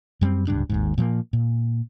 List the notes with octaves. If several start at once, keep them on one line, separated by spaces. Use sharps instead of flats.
F#2 G3 B3 C4
D1 C#2 G2 D4
G#1 D#2 G#2
A#2 F3 A3 A#3
A#2